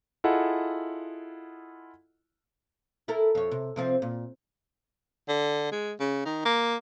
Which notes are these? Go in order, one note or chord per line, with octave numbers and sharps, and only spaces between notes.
E4 F4 G#4 A4 D#5 F#5
E4 A4 A#4
F2 C#5
C3
C3 F3 C4
A#2
D3
G#3
C#3
D#3
A#3